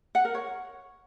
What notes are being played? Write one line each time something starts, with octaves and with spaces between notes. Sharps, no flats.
F#5
A#4
C#5